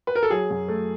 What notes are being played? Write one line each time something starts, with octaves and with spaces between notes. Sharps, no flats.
B4
A#4
A4
F#3 G#4
F#2
A3